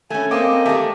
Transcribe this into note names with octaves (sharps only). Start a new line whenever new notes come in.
A3 C#4 G#5
A#3 C4 D#5 G5 D6
G#3 A3 G4 E5 A5